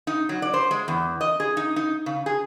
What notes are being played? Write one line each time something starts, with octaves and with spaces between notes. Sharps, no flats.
D#4
F#3
D5
C5
G#3
E2
D#5
G#4
D#4
D#4
C#3
G#4